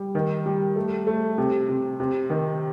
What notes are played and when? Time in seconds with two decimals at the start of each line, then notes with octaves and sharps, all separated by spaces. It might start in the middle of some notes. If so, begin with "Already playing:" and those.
Already playing: G3
0.15 D#3
0.46 G3
0.76 A3
1.07 A3
1.38 C3
1.69 C3
2.00 C3
2.30 D#3